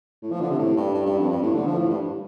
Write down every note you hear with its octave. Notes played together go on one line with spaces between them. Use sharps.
A2
F3
D3
C3
A2
G2
G2
G2
F2
G2
A2
D3
F3
A2
G2